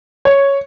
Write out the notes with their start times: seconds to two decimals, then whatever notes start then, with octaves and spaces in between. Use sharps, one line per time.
0.25 C#5